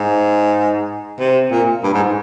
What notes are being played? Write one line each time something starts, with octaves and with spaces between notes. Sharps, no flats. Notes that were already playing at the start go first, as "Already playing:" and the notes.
Already playing: G#2
C3
A#2
G2
G#2